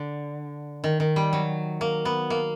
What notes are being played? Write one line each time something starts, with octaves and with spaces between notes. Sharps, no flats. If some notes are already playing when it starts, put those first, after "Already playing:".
Already playing: D3
D#3
D#3
G3
F#3
A#3
B3
A#3